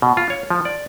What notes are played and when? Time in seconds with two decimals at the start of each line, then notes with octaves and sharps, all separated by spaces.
0.02 B2
0.17 F4
0.30 C#5
0.50 F3
0.65 D5